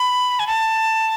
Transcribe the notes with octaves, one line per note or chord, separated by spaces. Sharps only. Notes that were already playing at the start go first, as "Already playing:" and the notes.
Already playing: B5
G#5
A5